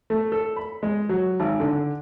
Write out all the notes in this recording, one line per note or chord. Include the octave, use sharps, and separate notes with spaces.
A3
A4
B5
G#3
F#3
G#1
D3